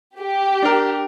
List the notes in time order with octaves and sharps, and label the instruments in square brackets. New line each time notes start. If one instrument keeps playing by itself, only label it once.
[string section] G4
[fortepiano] D4 A#4